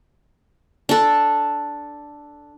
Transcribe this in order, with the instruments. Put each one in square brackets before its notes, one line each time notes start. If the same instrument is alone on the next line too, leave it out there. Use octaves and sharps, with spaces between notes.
[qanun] D4 A4